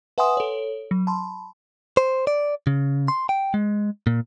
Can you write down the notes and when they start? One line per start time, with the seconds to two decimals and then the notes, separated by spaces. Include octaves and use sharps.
0.18 B4 E5 F#5 G#5 C6 D#6
0.37 A4 C#5
0.91 F#3
1.07 A5 B5 C6
1.97 C5
2.27 D5
2.67 C#3
3.08 C6
3.29 G5
3.54 G#3
4.07 A#2